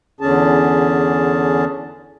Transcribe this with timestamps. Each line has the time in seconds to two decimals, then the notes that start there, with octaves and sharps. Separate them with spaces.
0.20 E2 D3 C#4 G#4 A5